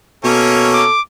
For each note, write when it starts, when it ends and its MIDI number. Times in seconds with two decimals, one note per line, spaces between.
0.24 0.86 47
0.24 0.82 58
0.24 0.82 61
0.24 0.93 69
0.24 0.82 73
0.74 1.01 86